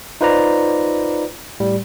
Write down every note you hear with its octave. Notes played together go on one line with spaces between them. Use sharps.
D#4 F4 B4 C5 D5 A#5
A2 G3